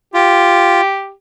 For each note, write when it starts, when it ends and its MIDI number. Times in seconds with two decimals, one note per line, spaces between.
0.14 0.81 65
0.14 1.11 67